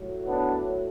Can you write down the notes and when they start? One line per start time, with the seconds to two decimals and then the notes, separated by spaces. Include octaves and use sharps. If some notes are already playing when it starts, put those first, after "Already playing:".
Already playing: A2 F#3
0.26 B3 D4